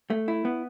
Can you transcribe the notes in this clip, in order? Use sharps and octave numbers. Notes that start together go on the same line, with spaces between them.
A3
E4
B3